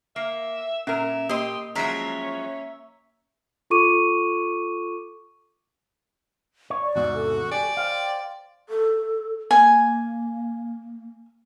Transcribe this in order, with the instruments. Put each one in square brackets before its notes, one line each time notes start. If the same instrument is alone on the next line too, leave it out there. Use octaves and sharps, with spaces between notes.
[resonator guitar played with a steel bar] A#3 [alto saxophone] E5
[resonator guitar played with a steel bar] A#2 A#4 [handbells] C#4 [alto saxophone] E5
[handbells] A#3 [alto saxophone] G4 [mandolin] D#5 C6
[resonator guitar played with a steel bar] F3 F#3 G#3 [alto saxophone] C#4 [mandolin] A#4 E5
[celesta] F4 A4 C#6 D6 D#7
[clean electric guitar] C#5
[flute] D5
[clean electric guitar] E2 G#2 C3 [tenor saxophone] F#4
[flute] A4
[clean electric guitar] G4 [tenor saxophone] D5 [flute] G#5
[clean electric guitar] C5 F5 [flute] G5
[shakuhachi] A4
[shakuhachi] A#3 [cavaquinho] G#5